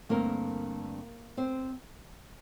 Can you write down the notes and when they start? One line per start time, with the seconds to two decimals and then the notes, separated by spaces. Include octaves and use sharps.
0.09 G2 D3 A3 A#3 C4 A#4
1.37 C4 C5